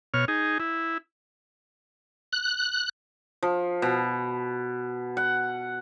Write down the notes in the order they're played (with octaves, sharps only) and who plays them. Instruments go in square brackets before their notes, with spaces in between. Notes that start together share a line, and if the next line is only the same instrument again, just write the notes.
[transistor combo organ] B2 C#5 F6
D#4 G#4
E4
[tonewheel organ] F#6
[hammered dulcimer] F3
B2
F#5